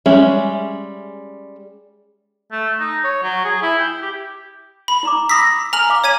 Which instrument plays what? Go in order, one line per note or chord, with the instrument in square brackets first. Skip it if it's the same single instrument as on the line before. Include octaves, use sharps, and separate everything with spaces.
[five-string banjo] G3 G#3 C#4 G#4 E5
[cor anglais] A3
D#4
C#5
F#3
G#4
E4
G5
G4
[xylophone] B5
[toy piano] E4 A#5 D6
[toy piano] B5 D#6 E6 [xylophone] A#6 B6
[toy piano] G#5 [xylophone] A#5 F6 F#7
[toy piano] F5 D6
[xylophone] C#5 G#6 D#7 [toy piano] F5